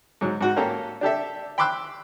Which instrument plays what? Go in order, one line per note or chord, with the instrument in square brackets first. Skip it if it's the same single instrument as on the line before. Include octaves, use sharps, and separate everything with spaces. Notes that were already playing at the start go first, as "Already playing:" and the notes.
[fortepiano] G#2 F#3
G#2 F#4
A#3 C#4 G4 A4 A#5
D4 G4 A4 E5
G5 B5 C6 D6 E6 F#6